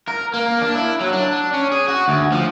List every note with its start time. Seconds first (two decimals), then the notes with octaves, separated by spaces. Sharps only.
0.08 A#4
0.34 A#3
0.61 D4
0.75 E4
1.01 F#3
1.13 D4
1.54 C#4
1.72 G#4
1.88 F#4
2.08 D2
2.32 F3